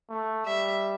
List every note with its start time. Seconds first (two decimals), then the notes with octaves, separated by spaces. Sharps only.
0.10 A3
0.46 G3 E5